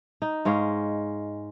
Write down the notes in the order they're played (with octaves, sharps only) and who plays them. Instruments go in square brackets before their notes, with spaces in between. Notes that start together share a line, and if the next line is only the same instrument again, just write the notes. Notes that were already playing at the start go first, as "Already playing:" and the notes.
[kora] D#4
G#2 G#3 C#5 F5